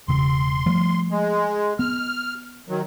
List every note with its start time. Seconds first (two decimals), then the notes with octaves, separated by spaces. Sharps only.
0.08 E1 C#3 C6
0.66 F3 G3 A3
1.10 G#3
1.79 B3 F6
2.69 D#3 F#3